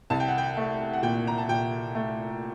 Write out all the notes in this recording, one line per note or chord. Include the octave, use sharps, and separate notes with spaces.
C2 A5
G5
F#5
G5
A3
F#5
A#2 G5
A#5
A5
A#2 G5
A3